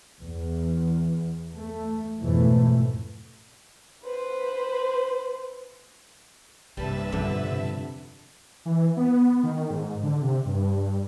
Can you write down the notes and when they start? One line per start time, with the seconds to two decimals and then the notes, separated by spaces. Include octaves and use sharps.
0.20 E2
1.55 A3
2.20 F2 G#2 B2 E3 A3
4.06 B4 C5
6.77 A#1 G2 C3 G3 B4 E5 A5
7.12 F2 B2 D3 G3 D4
8.66 E3
8.97 B3
9.43 D#3
9.71 G#2
10.03 D3
10.22 C3
10.46 G2